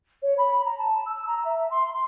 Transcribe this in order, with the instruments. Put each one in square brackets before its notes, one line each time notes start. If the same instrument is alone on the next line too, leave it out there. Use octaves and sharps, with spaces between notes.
[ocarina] C#5
B5
A#5
A5
E6
A#5
E5
C6
C6